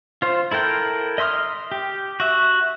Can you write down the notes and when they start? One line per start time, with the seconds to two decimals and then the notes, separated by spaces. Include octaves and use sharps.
0.22 F4 C5
0.51 E4 A4 A#4 G5
1.18 D#5 E5 C6 D#6 F6
1.72 G4
2.20 F#4 E5